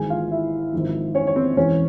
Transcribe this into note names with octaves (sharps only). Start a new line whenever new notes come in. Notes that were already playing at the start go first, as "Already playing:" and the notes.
Already playing: G#1 G#2 E3 G#4 G#5
F4 F5
E4 E5
G#1 G#2 F3
C#4 C#5
C#5
C4 C5
E1 E2 E3 C#4 C#5